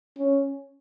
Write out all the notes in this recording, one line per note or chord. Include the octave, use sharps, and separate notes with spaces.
C#4